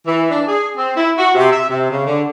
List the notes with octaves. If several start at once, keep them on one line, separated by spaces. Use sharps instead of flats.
E3
D4
G#4
C4
E4
F#4
C3
E5
C3
C#3
D3